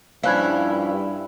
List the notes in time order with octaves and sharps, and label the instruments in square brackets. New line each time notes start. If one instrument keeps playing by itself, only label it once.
[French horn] G2 [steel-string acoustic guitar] F3 G3 C#4 [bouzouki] E4 [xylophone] F5 F#6 G#6